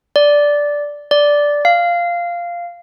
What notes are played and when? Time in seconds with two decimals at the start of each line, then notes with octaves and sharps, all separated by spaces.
0.16 D5
1.11 D5
1.65 F5